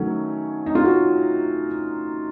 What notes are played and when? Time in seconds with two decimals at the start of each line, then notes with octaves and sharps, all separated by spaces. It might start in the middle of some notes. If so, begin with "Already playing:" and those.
Already playing: D#3 F#3 A3 C#4 A4
0.66 D#4
0.75 F4
0.85 F#4